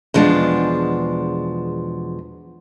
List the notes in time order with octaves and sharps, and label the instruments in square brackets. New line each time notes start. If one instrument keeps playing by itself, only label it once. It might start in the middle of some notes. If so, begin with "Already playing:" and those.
[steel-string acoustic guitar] E2 B2 F3 G#3 D4